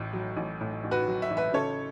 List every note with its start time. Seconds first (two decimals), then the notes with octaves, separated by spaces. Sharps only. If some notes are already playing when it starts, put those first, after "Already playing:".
Already playing: A1 A2
0.13 F#3
0.37 A1
0.61 A2
0.84 A1
0.91 F#4 B4
1.08 F#3
1.22 E5
1.31 A1
1.37 B4 E5
1.54 C#3 A4 C#5